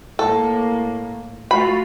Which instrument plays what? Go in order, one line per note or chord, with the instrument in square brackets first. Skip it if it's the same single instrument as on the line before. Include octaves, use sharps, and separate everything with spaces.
[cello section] A2 A#3 [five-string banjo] A4
[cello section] A3 F4 F#4 [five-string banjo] B5